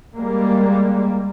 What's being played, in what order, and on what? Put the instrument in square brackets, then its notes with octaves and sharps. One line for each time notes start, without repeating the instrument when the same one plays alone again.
[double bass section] G3 G#3 A#3